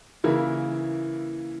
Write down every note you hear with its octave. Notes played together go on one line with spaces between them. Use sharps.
C#3 E3 A#3 E4 A#4